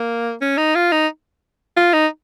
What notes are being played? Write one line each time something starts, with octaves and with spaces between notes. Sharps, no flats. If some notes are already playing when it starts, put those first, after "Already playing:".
Already playing: A#3
C#4
D#4
F4
D#4
F4
D#4